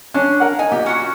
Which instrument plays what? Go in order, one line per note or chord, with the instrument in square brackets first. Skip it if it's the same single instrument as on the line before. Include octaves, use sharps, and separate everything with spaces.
[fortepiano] C#4 [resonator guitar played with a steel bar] D4
[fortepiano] A#4 F#5
[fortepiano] D#4 [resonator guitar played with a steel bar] G#5
[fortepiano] A#2 [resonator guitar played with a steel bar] G4
[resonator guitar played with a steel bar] C#4 F#4